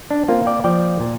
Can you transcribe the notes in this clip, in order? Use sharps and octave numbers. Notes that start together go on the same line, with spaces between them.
D4
A#3 C4 F4
D5 G5
F3 D5 G5
A#2